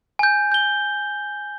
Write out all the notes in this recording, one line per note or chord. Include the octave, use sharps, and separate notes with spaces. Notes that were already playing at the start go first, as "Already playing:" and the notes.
G#5 G6
G6 G7